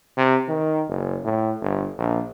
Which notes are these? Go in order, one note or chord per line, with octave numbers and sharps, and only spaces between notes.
C3
D#3
F#1
A2
G1
A#1